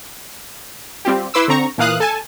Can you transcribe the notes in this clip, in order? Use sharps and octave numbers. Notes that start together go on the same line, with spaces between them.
G3 C4 F4 G4
E4 B4 C6 D6 E6
D3 C4 A#5 C#6
A#2 E3 A#3 F5 D#6 F#6
A4 G#5 A5